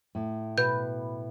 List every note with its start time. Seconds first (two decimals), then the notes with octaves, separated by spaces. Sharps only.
0.15 A2
0.58 B2 B4 G6